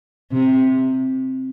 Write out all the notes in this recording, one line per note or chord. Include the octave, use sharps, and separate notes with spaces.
C3